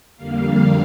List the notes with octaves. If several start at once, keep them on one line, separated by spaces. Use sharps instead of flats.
F2 D3 G3 A#3 F5